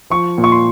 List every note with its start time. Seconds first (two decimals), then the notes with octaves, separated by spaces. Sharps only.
0.10 F3 C#6
0.38 A#2
0.44 C#6
0.52 C6